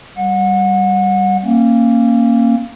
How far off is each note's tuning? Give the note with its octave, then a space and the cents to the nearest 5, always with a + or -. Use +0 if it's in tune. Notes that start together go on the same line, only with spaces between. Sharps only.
G3 -10 F#5 -30
A#3 -10 C#4 -30